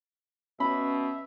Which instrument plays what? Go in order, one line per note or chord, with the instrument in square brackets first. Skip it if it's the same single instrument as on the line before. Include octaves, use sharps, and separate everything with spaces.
[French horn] B2 [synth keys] C#4 [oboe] E5 [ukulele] B5